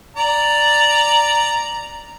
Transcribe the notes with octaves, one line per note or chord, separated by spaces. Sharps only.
D5 A#5